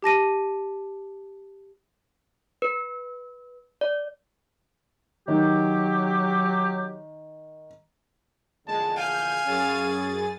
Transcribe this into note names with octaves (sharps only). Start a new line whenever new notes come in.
G4 A5 A#6 D#7
B4
D5
D#3 F#3 G4
A#1 E2 D3 G#3 A5
F5 G#5 G6
F#2 C#4 G#4 A6